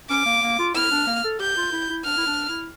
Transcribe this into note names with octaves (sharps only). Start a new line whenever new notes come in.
C#4 D6
A#3
A#3
F4
E4 F6
D4
A#3
A4
G4 G6
F4
E4
E4
D4 F6
E4
D4
E4